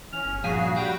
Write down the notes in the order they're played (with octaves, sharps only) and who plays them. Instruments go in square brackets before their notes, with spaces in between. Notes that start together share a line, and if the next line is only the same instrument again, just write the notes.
[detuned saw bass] E3 [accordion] C#4 [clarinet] F6
[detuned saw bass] G1
[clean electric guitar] G2 F3 G#5 [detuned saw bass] A#2 [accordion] C#3 F#4 G#4 [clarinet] F5
[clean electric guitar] G3 [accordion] F#4 G5 B5